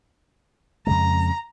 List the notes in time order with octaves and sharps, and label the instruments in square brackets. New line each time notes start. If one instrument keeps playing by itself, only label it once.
[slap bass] F2 C#3 G#3 [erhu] A#5